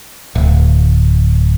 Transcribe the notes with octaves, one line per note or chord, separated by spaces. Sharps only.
D1